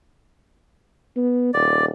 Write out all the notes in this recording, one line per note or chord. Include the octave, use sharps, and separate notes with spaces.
B3
D#1 D5